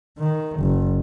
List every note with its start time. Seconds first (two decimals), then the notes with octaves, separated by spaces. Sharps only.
0.18 D#3
0.60 F#1